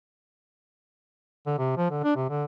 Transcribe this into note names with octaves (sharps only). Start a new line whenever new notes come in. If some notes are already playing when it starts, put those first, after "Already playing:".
D3
C3
F3
D3
D4
C3
D3